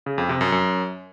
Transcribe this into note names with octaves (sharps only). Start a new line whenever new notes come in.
C#3
F2
C3
F#2
F#2